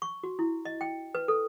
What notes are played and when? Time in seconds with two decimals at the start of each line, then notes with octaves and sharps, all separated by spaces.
0.02 C#6
0.23 F#4
0.39 E4
0.65 D#5
0.81 G5
1.15 B4
1.28 A4